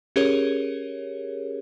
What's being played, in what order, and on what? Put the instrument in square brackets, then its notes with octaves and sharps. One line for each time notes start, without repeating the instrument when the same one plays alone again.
[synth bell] C#4 G4 G#4 A#4 C#5